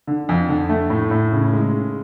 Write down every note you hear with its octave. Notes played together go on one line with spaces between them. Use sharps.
D3
F2
D3
A3
A2
A2
C#3
G#3
C#3